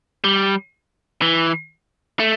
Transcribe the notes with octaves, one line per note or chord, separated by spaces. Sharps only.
G3
E3
A3